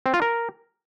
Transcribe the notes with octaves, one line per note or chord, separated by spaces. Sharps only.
C4
F4
A#4